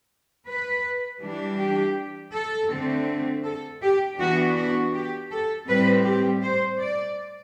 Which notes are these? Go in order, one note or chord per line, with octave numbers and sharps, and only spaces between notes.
B4
E3 G3 D4
G4
A4
D3 A3 C4
A4
G4
E3 B3 D4 F#4
F#4
G4
A4
A2 G3 C4 B4
G4
C5
D5